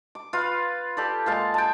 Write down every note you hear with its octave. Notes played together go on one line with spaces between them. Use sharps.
D6
F4 B4 F5
G4 A4 D5
A#2 G#3 F5 A5
G5 A5